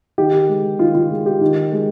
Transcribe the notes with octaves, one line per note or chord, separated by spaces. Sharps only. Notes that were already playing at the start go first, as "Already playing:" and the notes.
D#3 G4
G#3
D#3 F4
F4
G#3
G4
D#3
G#3